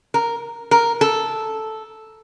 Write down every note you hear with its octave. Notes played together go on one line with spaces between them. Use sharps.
A#4
A#4
A4